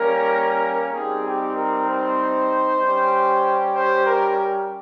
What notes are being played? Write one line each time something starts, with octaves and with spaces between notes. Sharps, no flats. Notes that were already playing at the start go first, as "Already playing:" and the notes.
Already playing: G3 A#3 C#4 A#4
G3 C4 D#4 G4 G#4
G4
A#4
C5
G3 C#4 G4
C5
A#4